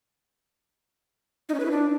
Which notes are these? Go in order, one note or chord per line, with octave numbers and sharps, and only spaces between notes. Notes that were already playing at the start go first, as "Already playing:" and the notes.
D#4
C#4
B4
E4
D4